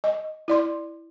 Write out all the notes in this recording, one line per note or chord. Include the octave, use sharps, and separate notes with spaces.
D#5
E4 D5 C6